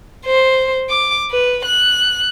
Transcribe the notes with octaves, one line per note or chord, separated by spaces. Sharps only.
C5
D6
B4
F#6